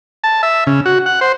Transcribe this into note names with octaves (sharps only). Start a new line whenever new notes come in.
A5
E5
C#3
F#4
F#5
C5